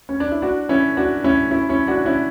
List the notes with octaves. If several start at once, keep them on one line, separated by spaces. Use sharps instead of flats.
C#4
D4
E4
D4 F#4
C#4 E4
D4 F#4
C#4 E4
C#4 E4
C#4 E4
D4 F#4
C#4 E4